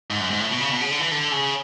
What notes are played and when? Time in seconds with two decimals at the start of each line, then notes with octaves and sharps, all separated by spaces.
0.10 G#2
0.20 F#2
0.30 G#2
0.40 A2
0.51 B2
0.60 C#3
0.71 B2
0.81 C#3
0.91 D3
1.00 E3
1.11 D3
1.32 C#3